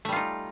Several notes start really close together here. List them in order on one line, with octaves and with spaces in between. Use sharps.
A3 G3 F4 D#4